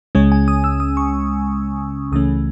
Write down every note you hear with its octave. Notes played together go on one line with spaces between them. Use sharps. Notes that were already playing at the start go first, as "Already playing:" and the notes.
C#2 C#3 G#3 C#4 C#5
G#5
D#6
E6
D#6
C#6
C#2 C#3 E3 A3 C#4 D#6